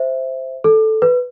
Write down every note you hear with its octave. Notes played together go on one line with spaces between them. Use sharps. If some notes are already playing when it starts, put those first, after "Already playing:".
Already playing: C5 E5
A4
B4